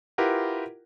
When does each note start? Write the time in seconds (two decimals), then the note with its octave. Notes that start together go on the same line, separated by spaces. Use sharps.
0.18 E4 F4 G4 A#4 B4 F#5